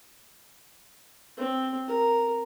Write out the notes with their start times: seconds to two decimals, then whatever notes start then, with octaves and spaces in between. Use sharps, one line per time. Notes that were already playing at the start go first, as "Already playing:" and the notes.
1.37 C4
1.87 A#4